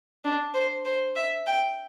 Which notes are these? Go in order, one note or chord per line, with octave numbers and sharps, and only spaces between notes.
D4
C5
C5
E5
G5